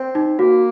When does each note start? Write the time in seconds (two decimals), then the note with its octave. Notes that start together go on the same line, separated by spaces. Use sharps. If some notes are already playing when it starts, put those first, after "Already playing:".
Already playing: C4
0.15 D#4
0.38 A#3 F#4